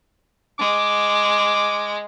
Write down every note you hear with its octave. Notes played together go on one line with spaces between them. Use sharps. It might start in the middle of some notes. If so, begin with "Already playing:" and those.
G#3 D6